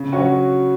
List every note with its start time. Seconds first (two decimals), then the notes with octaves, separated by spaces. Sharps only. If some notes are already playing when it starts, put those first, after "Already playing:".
Already playing: C#3
0.12 F#3 C#4 F#4